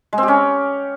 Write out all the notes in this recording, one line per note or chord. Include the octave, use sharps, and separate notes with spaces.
G#3
C4
G4
C#4